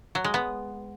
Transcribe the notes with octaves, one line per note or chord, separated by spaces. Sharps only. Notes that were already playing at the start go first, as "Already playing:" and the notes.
F#3
G#3
B3